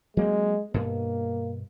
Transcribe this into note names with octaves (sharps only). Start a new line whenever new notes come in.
F#3 G#3 A#3 C4
G2 B2 A#3